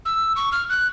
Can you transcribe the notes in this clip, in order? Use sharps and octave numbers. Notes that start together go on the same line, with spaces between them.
E6
C#6
F6
F#6